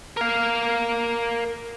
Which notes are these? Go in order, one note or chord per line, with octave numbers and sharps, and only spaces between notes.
A#4 F5